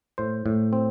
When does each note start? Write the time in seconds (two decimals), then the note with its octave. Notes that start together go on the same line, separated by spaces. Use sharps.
0.18 A2 C5
0.46 A2
0.73 C4